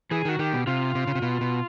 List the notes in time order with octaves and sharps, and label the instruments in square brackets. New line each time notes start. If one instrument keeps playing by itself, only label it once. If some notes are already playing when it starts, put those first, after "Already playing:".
[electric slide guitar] E3 [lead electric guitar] G#4
[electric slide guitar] D#3 [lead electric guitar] F#4
[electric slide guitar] D#3 [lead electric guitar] G4
[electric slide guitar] B2
[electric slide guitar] C3 [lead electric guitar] F4
[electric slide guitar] C3
C#3
C3
B2
B2